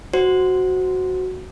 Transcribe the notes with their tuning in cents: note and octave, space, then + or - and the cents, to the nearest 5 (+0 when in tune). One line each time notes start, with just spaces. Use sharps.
F#4 +0 C5 -5